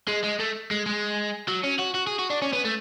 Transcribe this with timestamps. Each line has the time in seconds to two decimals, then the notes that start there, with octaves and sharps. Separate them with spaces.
0.08 G#3
0.24 G#3
0.40 A3
0.71 G#3
0.86 G#3
1.48 F#3
1.64 C#4
1.79 F#4
1.95 F#4
2.07 G#4
2.19 F#4
2.30 D4
2.42 C#4
2.53 B3
2.65 A3